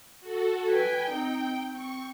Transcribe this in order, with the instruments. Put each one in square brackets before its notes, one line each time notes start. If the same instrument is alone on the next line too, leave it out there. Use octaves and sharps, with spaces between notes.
[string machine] F#4 A4
[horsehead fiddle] B4 G#5 [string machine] G5
[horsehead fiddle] C4 D#4
[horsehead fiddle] C4 [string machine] C#6